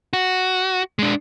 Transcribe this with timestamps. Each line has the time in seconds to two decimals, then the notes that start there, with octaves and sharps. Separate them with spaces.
0.13 F#4
0.99 G#3 D4